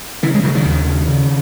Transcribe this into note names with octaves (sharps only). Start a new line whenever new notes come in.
C#3 E3
G#3
C#3 F#3
D#3
D#2
C#3
C#3